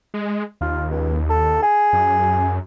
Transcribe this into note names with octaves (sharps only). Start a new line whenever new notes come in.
G#3
D#2 F4
C#2
A4
G#4
F#2